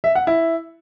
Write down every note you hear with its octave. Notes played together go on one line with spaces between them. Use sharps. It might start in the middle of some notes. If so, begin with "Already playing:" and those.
E5
F#5
E4